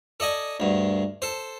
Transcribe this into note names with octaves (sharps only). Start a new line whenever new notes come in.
A4 D5 D#5 G#5
D2 G2
A4 C5